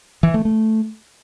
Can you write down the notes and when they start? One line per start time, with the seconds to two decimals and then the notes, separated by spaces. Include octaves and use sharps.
0.23 E3
0.34 A3
0.45 A3